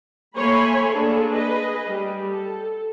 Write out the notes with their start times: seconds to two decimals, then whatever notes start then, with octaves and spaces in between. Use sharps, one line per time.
0.37 A3 A#3 C#5 G#5 B5 C6
0.92 A#3 D4 G#4 A4
1.34 G#4 B4 D#5
1.87 G3
2.28 A4